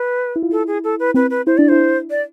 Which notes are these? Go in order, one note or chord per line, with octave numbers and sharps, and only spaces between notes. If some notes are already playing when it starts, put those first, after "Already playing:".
Already playing: B4
E4
F4
E4 A4
G#4
A4
B4
C4 B4
B4
E4 C5
D4 D5
E4 C5
D5